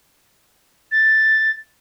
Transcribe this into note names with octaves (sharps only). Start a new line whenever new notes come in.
A6